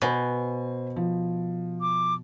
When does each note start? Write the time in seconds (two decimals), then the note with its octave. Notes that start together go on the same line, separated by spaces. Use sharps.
0.02 B2 C5 G#5
0.96 F3
1.81 D6